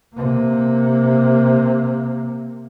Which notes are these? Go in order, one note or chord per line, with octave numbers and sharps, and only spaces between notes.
C3 A#3